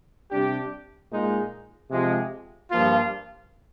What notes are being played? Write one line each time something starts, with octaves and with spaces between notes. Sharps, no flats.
C3 G3 D4 G4
A#2 G#3 D#4
C3 F3 G#3 C4
G2 F3 A#3 F4